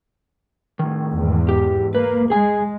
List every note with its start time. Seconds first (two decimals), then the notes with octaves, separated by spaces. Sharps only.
0.79 A2 D#3
1.12 E2 G#2
1.49 G4
1.95 A#3 B4
2.30 G#3 G#4 G#5